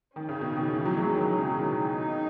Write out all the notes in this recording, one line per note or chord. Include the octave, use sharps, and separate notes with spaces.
D#3 C#4
C#3
B2 D#3
B2 D#3
E3
F#3
E3 G#3
D#3 F#3
C#3
B2 D#3
D#4